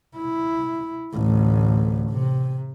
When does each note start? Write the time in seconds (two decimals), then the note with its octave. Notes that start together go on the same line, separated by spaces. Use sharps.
0.17 E4
1.13 A1 D2
2.11 C3